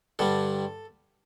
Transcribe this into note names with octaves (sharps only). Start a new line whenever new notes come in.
G2 D3 G3 A4